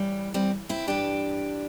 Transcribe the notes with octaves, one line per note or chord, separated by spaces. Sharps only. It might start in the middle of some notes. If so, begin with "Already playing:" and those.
Already playing: A2 E3 G3
G3 C4
C4 E4
G2 E3 D4 G4